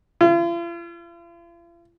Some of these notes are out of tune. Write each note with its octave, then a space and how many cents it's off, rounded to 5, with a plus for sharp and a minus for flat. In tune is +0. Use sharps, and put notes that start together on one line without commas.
F4 -45